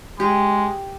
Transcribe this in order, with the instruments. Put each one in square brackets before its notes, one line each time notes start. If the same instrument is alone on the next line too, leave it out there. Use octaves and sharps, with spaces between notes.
[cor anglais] G#3 [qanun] G4